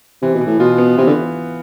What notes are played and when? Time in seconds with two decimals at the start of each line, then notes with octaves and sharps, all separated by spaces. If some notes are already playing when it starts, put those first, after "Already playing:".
0.22 C3 E3
0.35 B2
0.41 E3
0.47 A2
0.59 B2 F4
0.78 B3
0.98 C3 E3
1.07 D3